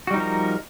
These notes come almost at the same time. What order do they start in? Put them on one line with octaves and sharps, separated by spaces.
F#4 G3 D#4 F3 A#4